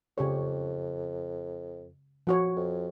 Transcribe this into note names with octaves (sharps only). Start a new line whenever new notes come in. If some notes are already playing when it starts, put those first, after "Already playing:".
F2 C#3 G4 C#5
F3 F#4 C#5
F2